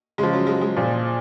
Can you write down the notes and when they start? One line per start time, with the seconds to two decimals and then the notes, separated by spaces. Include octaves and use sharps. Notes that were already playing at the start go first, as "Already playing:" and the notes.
0.18 C#3 F3 G#3
0.33 F#3
0.47 G#3
0.61 G#3
0.76 A#2 F3